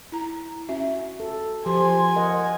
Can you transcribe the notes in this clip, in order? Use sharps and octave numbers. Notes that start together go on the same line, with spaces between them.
E4 A#5
C#4 F#4 E5
A4
F3 G4 C5 G#5 C6
A#4 D#5 F#5